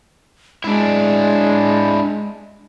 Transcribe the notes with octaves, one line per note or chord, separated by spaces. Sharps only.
G#3 D4 E4